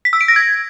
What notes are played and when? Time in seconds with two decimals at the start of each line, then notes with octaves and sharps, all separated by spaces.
0.05 B6
0.13 E6
0.21 D7
0.28 A#6
0.36 G#6